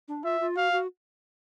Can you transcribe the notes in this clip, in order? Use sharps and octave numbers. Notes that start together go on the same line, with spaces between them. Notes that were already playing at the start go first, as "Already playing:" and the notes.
D4
F4 E5
F4
F#4 F5
F#4